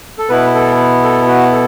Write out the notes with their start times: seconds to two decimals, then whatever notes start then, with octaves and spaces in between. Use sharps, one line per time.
0.18 A4
0.29 B2 B3 E4 B4
0.54 A4
1.03 A4
1.27 F#4
1.52 A4